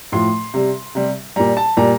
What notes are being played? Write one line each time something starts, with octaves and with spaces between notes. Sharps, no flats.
A2 F3 C6
C3 G3
C3 G3
A#2 G3 A#5
A5
A#2 G3 A#5